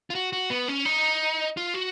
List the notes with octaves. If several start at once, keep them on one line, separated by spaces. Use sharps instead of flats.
F4
F#4
F#4
B3
C#4
D#4
F4
F#4